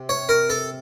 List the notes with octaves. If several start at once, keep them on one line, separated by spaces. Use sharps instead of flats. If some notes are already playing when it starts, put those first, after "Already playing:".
Already playing: C3
C#5
A#4
A4